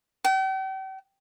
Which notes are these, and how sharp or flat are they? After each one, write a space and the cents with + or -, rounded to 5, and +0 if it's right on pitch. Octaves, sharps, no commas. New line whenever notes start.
G5 -40